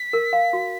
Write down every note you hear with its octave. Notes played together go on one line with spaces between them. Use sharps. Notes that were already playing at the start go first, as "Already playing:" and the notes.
Already playing: B6
A#4
F5
F#4